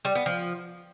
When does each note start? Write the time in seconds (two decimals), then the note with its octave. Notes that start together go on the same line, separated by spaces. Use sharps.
0.05 G3
0.15 B3
0.26 F3